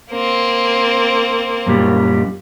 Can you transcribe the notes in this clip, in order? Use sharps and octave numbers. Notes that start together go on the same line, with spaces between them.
A#3 C4
F#2 A#2 G3